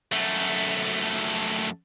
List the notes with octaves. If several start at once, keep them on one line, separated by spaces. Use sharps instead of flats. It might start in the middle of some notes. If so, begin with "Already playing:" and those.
F#2 A3